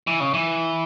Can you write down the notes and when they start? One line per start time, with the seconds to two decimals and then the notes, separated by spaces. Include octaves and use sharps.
0.07 E3
0.20 C#3
0.34 E3